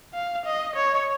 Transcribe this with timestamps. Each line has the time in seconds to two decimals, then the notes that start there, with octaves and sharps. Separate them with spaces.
0.14 F5
0.46 D#5
0.76 C#5